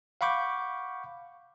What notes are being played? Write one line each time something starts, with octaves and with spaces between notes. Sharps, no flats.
F5 F#5 B5 C#6 D6 G6